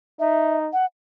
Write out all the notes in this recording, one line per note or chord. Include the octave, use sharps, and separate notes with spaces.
D#4 E5
F#5